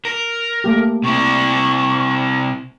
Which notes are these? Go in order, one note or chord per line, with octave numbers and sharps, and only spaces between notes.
A#4
A3 A#3 G4
C3 E4 C#6